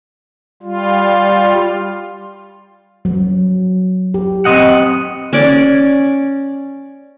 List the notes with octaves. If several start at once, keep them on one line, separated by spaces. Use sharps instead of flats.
G3 F4
F#3
G4
C4 D#5 F#5
C#4 D5